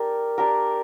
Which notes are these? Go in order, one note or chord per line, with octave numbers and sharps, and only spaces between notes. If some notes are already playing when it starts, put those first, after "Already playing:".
Already playing: D4 G4 A#4
D4 G4 A#4